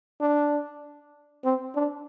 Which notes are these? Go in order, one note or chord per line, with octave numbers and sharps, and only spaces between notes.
D4
C4
D4